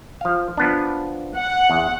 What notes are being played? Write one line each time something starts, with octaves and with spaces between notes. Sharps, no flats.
F3 F5
F3 B3 D4
F#5
E2